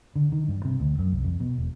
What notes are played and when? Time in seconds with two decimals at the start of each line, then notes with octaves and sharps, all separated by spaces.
0.16 D3
0.32 D#3
0.48 G2
0.65 C3
0.80 D2
0.99 F#2
1.13 C2
1.24 F2
1.40 B2
1.58 E1